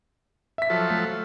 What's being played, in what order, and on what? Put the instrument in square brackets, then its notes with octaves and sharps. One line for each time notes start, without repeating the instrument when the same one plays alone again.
[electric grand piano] E5 B6
[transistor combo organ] F3 F#3 A4
[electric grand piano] A3